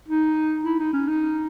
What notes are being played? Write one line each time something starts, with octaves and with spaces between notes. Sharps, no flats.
D#4
E4
D#4
C#4
D#4